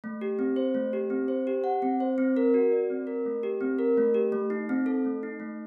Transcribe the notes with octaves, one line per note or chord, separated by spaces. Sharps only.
A3
G4
C4
C5
A3
G4
C4
C5
G4
F#5
C4
C5
C4
A#4
F#4
D5
C4
A#4
A3
G4
C4
A#4
A3
G4
A3
D#4
C4
A4
A3
D#4
A3